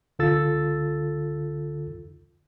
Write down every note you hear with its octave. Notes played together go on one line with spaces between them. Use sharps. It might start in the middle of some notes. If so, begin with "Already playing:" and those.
C#2 D3 F4 A4 E6 A6